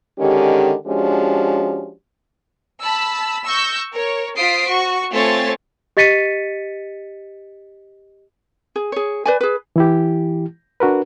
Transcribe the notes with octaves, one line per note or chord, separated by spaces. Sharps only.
D3 D#3 G#3 C#4 G4
F3 G#3 C#4 D4 F#4 G4
A5 B5 E6
C#6 E6 G6 A#6
A#4 C#5
F4 C5 D#6 B6 C7 D7
F#4 C#6
A3 C4 F4 C#5 G#5 A6
G4 D#5 A6 B6 C#7 D#7
G#4
G#4 C#5
B4 D5 G#5
G#4 B4
E3 E4 G4
D4 F#4 A#4 B4